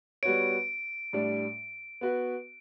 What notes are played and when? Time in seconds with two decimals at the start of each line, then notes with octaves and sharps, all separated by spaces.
0.23 G3 B3 F#4 C#5 D7
1.13 A2 G3 D4
2.01 B3 F#4 B4